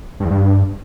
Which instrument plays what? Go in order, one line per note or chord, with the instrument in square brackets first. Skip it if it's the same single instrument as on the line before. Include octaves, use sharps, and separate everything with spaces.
[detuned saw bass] G2
E2
G2